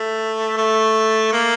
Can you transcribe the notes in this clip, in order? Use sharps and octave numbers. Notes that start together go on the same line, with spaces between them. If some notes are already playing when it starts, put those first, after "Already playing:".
Already playing: A3
A3
A#3